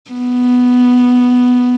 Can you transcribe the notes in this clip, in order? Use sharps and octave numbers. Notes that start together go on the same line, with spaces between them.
B3